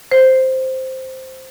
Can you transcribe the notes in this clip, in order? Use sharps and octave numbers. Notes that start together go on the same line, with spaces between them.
C5